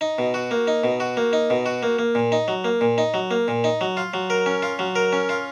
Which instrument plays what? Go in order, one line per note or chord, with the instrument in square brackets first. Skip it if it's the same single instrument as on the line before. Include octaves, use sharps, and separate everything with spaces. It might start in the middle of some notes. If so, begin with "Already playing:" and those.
[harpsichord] D#4
B2
F#4
A#3
D#4
B2
F#4
A#3
D#4
B2
F#4
A#3
A#3
A#2
D#4
F#3
A#3
A#2
D#4
F#3
A#3
A#2
D#4
F#3
F4
F#3
A#4
C#4
F4
F#3
A#4
C#4
F4